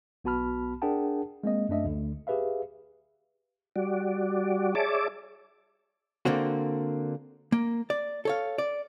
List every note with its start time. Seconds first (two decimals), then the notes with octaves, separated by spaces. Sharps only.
0.24 B1 B3 F#4 A5 B5 F6
0.82 D4 G#4 A#4 F#5 G5 A5
1.44 G#3 A#3 C4 D#5
1.69 F#2 A3 D4 D#5 E5
1.85 D2 D3
2.27 G4 G#4 B4 E5 F5
3.76 G3 F#4 D5
4.75 G#4 C#5 D5 E5 A5 D6
6.25 D3 A#3 C4 F#4
7.52 A#3
7.90 D5
8.25 A4 C#5 F5
8.58 D5